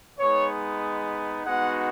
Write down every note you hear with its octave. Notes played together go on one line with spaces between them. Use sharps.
G#3 B3 D#4 C#5
G#3 B3 D#4 F#4 F#5